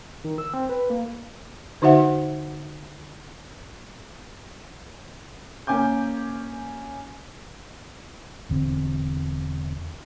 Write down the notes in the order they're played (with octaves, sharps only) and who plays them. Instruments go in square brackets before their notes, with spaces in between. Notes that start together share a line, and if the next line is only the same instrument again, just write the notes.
[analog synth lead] D#3
E6
C4
B4
A#3
[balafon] D3 D#4 F#4 C5 E5 F#5
[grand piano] A#3 C#4 G#5 D6 G6
[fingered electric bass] E1 D3 C4